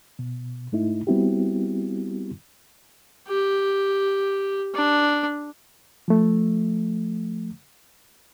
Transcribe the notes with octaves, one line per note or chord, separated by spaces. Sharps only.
B2
G#2 A3 D#4 E4
G3 B3 C4 E4 F#4 G4
G4
D4
F3 A3